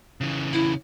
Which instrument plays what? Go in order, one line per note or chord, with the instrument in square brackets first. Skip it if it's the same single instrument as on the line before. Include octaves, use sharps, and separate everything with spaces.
[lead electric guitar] C#3 E3
[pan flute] E4